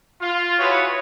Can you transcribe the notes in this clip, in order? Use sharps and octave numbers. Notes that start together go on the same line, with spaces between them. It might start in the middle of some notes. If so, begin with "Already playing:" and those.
F4
E4 F#4 G#4 B4 C#5